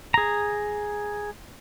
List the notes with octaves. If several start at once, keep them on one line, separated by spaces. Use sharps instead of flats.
G#4 A#5